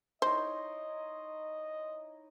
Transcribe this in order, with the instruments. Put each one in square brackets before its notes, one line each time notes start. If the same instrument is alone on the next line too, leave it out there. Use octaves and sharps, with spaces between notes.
[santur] D#4 E4 C#5 [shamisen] C5 [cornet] D#5 [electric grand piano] C6